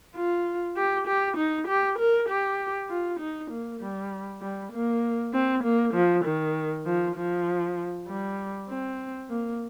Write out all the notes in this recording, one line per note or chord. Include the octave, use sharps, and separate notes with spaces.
F4
G4
G4
D#4
G4
A#4
G4
F4
D#4
A#3
G3
G3
A#3
C4
A#3
F3
D#3
F3
F3
G3
C4
A#3